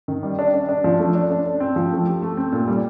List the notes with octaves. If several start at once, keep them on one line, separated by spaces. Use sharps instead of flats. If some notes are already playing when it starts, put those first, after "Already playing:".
D#3
G3
D4
D4
D4
F3
A3
D4
D4
D4
C4
F3
A3
G4
A3
C4
A#2
G3